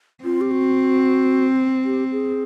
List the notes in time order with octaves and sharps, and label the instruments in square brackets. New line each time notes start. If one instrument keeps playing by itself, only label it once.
[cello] C4 [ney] F4
[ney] G4
F#4
G4
G#4